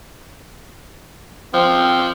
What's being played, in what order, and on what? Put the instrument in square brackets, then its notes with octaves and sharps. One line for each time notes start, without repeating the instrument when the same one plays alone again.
[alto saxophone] F3 [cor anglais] C4